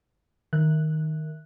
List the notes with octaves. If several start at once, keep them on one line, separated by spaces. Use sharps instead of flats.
D#3 A#4 E5 F#6